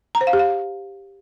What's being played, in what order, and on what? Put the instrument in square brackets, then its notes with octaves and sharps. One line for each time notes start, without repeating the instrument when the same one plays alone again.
[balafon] A#5
C5
F5
G4
F5